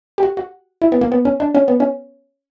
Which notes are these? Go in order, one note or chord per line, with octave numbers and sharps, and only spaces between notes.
G4
F#4
F#4
E4
B3
A#3
B3
C#4
D4
C#4
B3
C#4